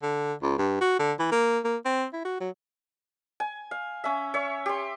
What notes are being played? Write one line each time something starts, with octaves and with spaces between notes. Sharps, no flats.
D3
C#2
G2
F#4
D3
E3
A#3
A#3
C4
E4
F#4
F#3
G#5
F5
C#4 E5
C#5 E5
G4 C6